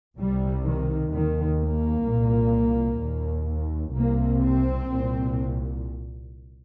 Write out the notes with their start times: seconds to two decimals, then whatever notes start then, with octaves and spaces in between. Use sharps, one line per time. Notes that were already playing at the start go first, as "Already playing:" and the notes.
0.17 C2 C3 G3
0.64 D#3
1.11 D#2 D#3
1.59 A#3
2.05 C2 A#2
3.00 D#2
3.95 C2 C3 A#3
4.41 C4
4.89 C2 A#2